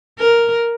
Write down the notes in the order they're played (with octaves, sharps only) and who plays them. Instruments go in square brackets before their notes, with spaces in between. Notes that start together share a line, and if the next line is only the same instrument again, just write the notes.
[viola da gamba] A#4